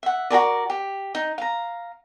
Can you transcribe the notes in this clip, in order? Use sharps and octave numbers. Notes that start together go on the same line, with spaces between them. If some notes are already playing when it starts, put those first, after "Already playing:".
E5 F#5
F#4 G#4 A#4 D5
G4
D#4
F5 A#5